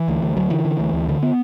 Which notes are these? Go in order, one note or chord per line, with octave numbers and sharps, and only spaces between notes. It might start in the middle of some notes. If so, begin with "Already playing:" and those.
Already playing: E3
D2
D2
D2 F#3
D3 E3
D3
D2
D2
D3
B3